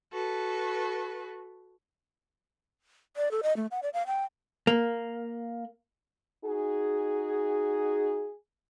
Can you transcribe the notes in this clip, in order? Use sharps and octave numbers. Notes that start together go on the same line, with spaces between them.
F#4 A4 B4
D5
A4
D#5
A3
F#5
D5
F5
G5
A#3
D#4 F#4 G#4